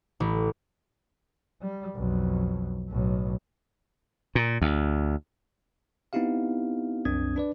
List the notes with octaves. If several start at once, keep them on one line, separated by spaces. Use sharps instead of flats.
A1
G3
B1 F2
B1 A2
A#2
D2
B3 C4 D#4 E4 G4 F5
C2 F#2 C4 D4 D#6 G#6
D4 B4 D5